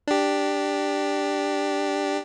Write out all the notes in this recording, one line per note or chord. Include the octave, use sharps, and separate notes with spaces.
D4 G4